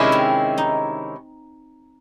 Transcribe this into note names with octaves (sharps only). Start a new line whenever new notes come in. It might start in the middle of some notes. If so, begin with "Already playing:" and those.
Already playing: C3 D#3 G#3 C#4 E4
C4
D#4